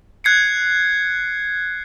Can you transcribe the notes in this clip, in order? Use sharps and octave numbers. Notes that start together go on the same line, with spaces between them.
F#6 G#6 C7 C#7